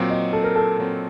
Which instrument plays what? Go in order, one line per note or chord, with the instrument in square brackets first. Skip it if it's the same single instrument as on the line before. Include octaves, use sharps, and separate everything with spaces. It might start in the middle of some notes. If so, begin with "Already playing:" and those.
Already playing: [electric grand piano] A#2 F#3 C4
[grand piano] D#5
A4
A#4
A4
[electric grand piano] A#2 F#3 C4